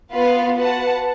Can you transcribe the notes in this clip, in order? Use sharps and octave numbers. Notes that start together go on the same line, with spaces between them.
B3 F4 B4 F5
F#4 B4 F#5 A5